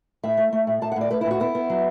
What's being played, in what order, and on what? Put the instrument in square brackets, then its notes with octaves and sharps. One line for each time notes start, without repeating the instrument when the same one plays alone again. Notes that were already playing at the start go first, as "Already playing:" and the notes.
[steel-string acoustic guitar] A2 E5
A3
A3
A2
A2 A5
F#5
A2
D5
A3 B4
E4
A2
F#4
B3 E4
B3
F#3